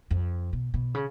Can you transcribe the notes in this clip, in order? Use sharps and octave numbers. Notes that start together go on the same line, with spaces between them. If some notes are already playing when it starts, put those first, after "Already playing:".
F2
B2
B2
C#3